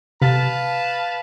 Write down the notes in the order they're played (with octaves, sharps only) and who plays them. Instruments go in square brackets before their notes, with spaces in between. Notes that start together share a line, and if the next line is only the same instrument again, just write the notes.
[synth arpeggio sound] C3 [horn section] B4 F5 A5